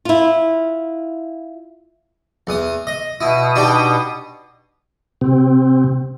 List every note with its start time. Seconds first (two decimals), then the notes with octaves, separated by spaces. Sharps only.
0.05 E4 F4
2.47 E2 D#6
2.87 D#5
3.21 B2 E4 D#6
3.55 D4 D#4 G4
5.21 C3 C4